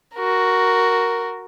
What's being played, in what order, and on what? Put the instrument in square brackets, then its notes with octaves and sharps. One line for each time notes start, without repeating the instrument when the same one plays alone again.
[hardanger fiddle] F#4 A#4